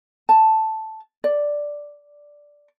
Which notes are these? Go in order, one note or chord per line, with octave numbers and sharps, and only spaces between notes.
A5
D5